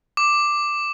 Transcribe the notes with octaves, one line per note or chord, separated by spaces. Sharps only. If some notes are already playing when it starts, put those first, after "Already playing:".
D6